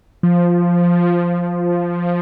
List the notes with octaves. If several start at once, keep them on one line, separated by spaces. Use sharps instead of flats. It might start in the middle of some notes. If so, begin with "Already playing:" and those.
F3